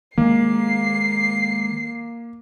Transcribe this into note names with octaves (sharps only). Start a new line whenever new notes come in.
D#3 G#3 A#3 C7